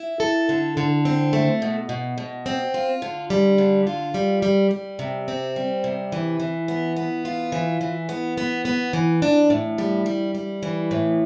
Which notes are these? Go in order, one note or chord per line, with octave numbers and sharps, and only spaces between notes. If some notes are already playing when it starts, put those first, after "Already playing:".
Already playing: E4
A4
D3
D3
C4
A3
B2
B2
B2
C4
F4
D3
G3
D3
F4
G3
G3
G3
C3
C4
G3
C3
E3
E3
B3
B3
F4
E3
E3
B3
B3
B3
E3
D4
A2
G3
G3
G3
E3
A2